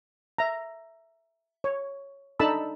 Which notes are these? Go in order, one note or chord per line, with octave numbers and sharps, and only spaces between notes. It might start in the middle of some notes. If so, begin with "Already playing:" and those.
E5 A#5
C#5
D4 D#4 A4 A5 B5 E6